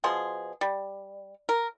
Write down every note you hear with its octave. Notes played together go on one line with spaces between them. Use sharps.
B2 F3 G#4 C6
G3
A#4